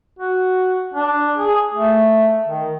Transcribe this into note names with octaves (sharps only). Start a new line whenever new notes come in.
F#4
D4
G#4
A3
D#3